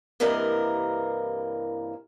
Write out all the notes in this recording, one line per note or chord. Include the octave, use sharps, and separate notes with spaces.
G2 C3 E3 A#3 A#4 D#5